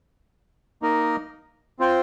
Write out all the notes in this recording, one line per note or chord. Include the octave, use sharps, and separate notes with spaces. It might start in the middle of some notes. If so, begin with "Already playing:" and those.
A#3 D#4 A#4 D#5
C4 F4 C5 G5